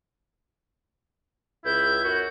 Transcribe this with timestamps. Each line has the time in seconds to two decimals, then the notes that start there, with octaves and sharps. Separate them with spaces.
1.65 C#2 E4 G6
2.04 F#2 F#4